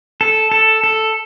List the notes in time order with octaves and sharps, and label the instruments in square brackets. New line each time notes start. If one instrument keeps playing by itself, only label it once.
[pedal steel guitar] A4
A4
A4